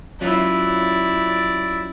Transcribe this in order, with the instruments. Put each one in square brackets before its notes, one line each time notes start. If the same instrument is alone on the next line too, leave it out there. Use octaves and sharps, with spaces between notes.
[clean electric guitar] F#3 C#4 F4 [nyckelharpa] E4 D5